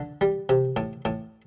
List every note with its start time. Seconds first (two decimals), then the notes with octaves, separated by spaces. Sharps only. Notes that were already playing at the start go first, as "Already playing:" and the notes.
Already playing: D3
0.21 G3
0.49 C3
0.76 A2
1.05 A2